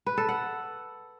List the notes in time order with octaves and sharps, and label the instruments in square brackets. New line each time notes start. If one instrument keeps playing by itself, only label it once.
[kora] B4
A4
F#5